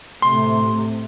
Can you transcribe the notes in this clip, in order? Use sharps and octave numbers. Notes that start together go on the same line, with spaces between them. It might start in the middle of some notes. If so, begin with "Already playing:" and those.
A2 C3 A3 C6